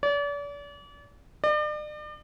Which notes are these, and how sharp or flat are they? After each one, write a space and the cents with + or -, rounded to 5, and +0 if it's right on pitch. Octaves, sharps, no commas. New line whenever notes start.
D5 -40
D5 +40